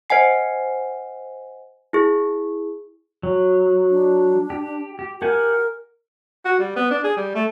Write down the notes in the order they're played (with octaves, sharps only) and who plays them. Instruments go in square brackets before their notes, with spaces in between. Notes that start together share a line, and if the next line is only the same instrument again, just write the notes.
[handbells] C5 D#5 F#5 G#5 C7
E4 G#4
[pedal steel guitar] F#3
[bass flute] D4
[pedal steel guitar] G4
G4
[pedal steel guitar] G4 F#5 G#5 [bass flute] A#4
[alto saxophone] F#4
G3
B3
D4
G#4
G3
A3